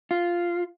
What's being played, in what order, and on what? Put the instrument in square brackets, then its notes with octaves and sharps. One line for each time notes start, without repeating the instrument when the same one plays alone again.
[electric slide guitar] F4